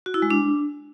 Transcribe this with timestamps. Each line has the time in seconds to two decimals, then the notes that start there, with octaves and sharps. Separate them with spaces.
0.06 F#4
0.14 E4
0.22 G#3
0.30 D4